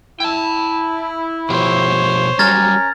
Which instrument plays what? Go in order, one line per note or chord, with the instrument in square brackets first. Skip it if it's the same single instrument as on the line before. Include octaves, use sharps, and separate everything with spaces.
[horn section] E4 [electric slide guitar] G5 A5
[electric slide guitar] B2 F3 G4 [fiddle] C5 C#5
[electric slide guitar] F#3 G3 [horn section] C#4 A#4 A#5 [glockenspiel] F6 G#6 A6